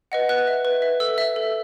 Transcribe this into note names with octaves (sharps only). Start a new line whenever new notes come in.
B4 D#5 F#5
B4 F#6
E5
B4
E5
A4 E6
E5
A4